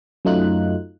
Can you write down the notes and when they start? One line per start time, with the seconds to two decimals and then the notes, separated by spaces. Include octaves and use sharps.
0.25 F#2 F#3 A3 D#4 F4 F#6